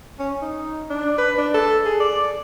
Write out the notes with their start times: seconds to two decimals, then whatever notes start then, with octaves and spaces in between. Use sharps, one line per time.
0.19 C#4
0.42 D#4
0.90 D4
1.18 B4
1.38 D4
1.55 A4
1.86 G#4
2.00 D5